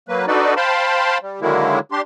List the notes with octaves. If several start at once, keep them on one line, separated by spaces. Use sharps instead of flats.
F#3 A#3 B4
D4 D#4 F#4 A4 B4 D5
C5 F5 G5 A5 B5 C6
G3
D3 D#3 F#3 G#3 A#3 E4
D4 G4 C6